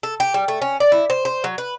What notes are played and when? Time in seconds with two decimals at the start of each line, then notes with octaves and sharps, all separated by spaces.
0.03 A4
0.20 G4
0.34 G3
0.48 A3
0.62 C#4
0.80 D5
0.92 E4
1.10 C5
1.25 C5
1.44 F#3
1.58 B4